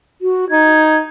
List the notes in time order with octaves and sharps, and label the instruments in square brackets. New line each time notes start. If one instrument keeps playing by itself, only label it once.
[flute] F#4
[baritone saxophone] D#4 [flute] G#6